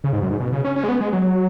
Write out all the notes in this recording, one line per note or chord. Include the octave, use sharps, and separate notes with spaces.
C#3
G#2
F#2
G#2
B2
C#3
C#4
C#4
G#3
B3
G#3
F#3